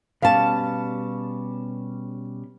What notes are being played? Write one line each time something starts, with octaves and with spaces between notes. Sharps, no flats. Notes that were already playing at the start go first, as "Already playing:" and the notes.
B2 G3 C#4 F5 A5